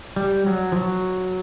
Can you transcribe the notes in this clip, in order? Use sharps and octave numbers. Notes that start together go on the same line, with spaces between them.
G3
F#3
F3
F#3